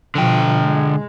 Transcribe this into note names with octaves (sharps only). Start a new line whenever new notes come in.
B2 D3 F3 G5
G#3